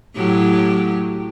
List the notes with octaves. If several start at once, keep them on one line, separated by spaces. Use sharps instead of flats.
A2 F#3 G4